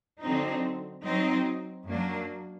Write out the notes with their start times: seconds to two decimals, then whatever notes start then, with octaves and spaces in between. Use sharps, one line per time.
0.22 D3 F#3 C4 D#4
1.04 F#3 C4 D#4
1.86 F#2 F#3 A#3 D4